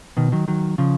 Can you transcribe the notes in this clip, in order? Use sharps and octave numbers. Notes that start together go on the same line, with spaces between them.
B2 D#3
D#3 F#3
D#3 F#3
C#3 F3